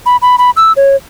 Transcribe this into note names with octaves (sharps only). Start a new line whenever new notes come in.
B5
B5
B5
E6
C#5